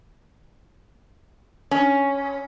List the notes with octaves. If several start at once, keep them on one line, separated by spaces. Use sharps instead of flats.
C#4